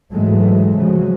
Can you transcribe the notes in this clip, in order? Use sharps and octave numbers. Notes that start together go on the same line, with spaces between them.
G#2 E3 F#3 G#3 A3
C#3 F3 F#3 G#3